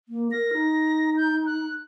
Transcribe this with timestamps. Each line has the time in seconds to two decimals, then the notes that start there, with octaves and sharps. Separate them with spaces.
0.09 A#3
0.32 A#4 A#6
0.53 D#4
1.17 G6
1.46 F#6